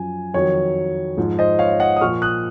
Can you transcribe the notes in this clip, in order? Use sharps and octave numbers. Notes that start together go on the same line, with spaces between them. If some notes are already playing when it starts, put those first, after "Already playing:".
Already playing: F#2 F3 G#5
F2 D#3 F#3 C#5
G#2 F3
C5 D#5
C#5 F5
D#5 F#5
D#6
A#2 F3 C#6 F6
D#6 F#6